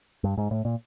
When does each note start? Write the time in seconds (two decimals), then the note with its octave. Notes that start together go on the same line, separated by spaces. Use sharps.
0.24 G2
0.38 G#2
0.51 A2
0.65 A#2